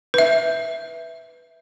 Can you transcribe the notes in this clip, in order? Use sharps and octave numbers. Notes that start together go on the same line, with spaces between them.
B4 E5